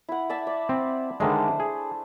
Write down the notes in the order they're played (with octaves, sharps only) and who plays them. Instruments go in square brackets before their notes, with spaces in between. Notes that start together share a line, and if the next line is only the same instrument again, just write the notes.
[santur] E4 F#5
D5 E5 A5
D5
[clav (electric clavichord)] C4
[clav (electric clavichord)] D3 D#3 G#3 [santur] A3 D4 C5
[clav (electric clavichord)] G#4